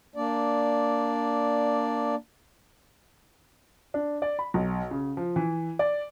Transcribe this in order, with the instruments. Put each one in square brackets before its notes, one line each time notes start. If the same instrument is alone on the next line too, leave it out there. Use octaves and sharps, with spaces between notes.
[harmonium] A#3 D4 D5
[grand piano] D4
D5
B5
B1
C#3
F3
E3
D5